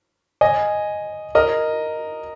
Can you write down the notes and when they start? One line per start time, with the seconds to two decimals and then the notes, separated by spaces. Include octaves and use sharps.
0.41 D#5 G#5
1.35 A#4 D#5